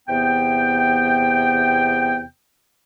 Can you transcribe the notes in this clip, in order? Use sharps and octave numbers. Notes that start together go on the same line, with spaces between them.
E2 C3 B3 G5